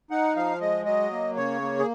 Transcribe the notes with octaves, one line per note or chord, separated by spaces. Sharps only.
D#4 F#5
F3 F5
G#3 D#5
F#3 D#5
A#3
C#3 C#5
A#3
G#4